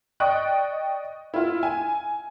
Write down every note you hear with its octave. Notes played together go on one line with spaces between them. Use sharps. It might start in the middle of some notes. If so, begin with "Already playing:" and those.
D5 D#5 G5 C#6 F#6
E4 F4
G#5